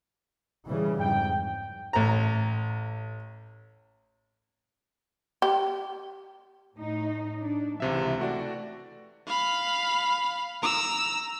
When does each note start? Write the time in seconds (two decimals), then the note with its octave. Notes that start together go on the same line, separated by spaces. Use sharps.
0.67 C#3 E3 G3
1.00 F2 G#2 G5
1.93 A1 A#5
5.42 G4
6.76 A2 D#4
7.41 D4
7.80 C#2 C3 E3 E5
8.19 A3 F#4 D5
9.27 F5 B5
10.62 A#5 E6